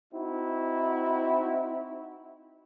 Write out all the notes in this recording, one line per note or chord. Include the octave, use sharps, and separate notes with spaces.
C4 D#4 E4 F#4